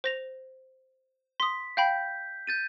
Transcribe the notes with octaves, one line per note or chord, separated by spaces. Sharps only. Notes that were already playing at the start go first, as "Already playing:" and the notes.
C5 A#6 F7
C6 D#6 B6
F5 G5 B5 G6
G6 A6 D#7